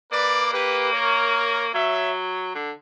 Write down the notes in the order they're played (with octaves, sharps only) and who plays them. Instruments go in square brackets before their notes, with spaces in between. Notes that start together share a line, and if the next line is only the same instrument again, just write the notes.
[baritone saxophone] A#3 [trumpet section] B4 D5
[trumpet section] G4 B4
A#4 C#5
[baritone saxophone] F#3 [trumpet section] C#5 E5
[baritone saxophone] D3